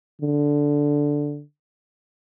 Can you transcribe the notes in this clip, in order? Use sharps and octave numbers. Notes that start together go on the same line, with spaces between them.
D3